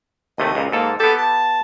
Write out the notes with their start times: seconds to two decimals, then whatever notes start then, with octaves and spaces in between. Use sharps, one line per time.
0.38 D#2 C3 A3 D#5
0.55 C#2 A#2
0.72 G#2 A#3 A4
1.00 B3 G4 A4
1.18 A5